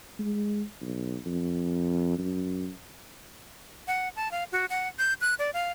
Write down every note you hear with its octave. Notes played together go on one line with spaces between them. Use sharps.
G#3
B1
F2
F#2
F#5
A5
F5
F#4
F#5
G6
F#6
D5
F5